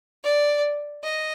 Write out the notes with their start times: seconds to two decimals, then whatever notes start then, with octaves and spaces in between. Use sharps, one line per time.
0.24 D5
1.04 D#5